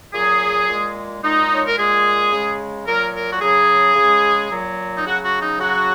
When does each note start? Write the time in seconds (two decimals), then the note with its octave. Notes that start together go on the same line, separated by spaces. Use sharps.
0.14 A#2 F#3 G#4
0.68 A#2 G#3
1.23 A#2 G#3 D#4
1.54 C#5
1.66 A#4
1.78 A#2 G#3 G#4
2.32 C#3 G#3
2.86 A#2 F#3 A#4
3.14 A#4
3.31 F#4
3.41 C#3 F#3 G#4
3.96 C#3 G#3
4.50 A#2 F#3
4.97 D#4
5.05 C#3 F#3 F#4
5.23 F#4
5.41 D#4
5.59 C#3 F#3 F#4